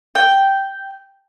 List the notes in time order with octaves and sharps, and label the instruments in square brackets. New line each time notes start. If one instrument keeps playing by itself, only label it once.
[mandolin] G5